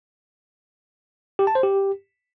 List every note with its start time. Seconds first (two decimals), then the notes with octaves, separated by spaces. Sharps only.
1.39 G4
1.47 A5
1.55 C5
1.63 G4